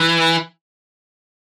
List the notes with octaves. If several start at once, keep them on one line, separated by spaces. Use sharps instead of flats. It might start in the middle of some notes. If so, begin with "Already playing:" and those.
Already playing: E3